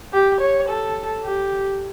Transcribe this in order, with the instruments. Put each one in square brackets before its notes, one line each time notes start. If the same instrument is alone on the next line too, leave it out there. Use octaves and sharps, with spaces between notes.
[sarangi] G4
C#5
A4
G4